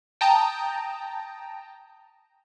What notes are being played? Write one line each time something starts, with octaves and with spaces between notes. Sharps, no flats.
G5 A5 A#5 D#6